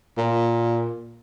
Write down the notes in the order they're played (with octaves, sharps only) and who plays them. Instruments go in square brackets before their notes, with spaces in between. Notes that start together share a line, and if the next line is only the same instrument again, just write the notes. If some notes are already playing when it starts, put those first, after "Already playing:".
[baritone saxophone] A#2